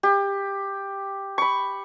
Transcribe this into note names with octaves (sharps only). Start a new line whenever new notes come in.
G4
B5 C#6